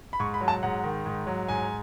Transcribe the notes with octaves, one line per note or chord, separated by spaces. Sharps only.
B5
G#2 C#6
B5
F#3
A5
G#2 F#5
D#3
G#2
F#3
G#2 G#5